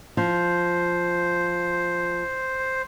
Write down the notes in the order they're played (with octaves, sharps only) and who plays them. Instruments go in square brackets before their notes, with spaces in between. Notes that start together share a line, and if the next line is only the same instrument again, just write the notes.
[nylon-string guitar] F3 [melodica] C5